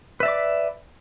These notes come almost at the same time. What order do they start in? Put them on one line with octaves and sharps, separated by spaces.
B4 E5 D5 D6